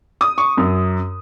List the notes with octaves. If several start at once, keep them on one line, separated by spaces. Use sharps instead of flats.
D#6
C#6
F#2